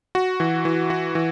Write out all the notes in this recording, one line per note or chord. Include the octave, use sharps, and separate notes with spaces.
F#4
E3
E3
F#4
E3